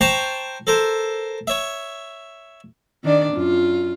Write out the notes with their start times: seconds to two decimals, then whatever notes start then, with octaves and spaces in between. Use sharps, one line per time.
0.01 C5 G5 A5 A#5 C6 C#6
0.67 A4 A#4 C5
1.47 C#5 E5
3.04 D#3 D4 D5
3.34 F#2 F4